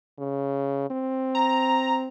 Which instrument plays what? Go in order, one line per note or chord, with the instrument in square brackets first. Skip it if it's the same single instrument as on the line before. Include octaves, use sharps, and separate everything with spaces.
[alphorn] C#3
C4
[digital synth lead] A#5